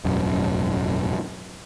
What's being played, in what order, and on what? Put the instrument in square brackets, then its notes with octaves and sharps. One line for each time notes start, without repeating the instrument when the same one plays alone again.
[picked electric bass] E1 A1 F#2